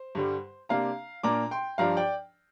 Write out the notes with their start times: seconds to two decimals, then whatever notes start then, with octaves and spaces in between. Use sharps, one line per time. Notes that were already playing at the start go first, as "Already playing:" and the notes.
Already playing: C5
0.15 G2 D3 G3
0.69 C3 A#3 D4 F5 A#5
1.23 A#2 A#3 D4 A#5 D6
1.51 G5 C6
1.78 G2 F3 D4 F5 A#5
1.97 D5 G5